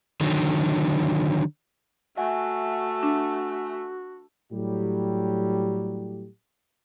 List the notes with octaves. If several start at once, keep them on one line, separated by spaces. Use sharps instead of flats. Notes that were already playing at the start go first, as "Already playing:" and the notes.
D3 D#3 F#3
A3 F#4 E5 F#5 G#5
D4
A2 F#3 G3 G4